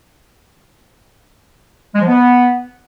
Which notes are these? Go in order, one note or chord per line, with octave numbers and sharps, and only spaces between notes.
G#3
F3
B3